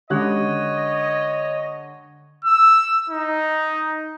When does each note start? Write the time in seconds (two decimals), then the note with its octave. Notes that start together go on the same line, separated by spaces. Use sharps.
0.10 D3 G#3 C#4 G4 C#5 D#5 F#6
2.45 E6
3.10 D#4